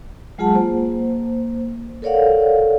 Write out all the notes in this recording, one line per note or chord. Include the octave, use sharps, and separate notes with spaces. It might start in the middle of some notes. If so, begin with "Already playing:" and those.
F#3 G#3 F4 G#4 F#5 A5
A#3 C5
A4 A#4 C#5 D5 F5 F#5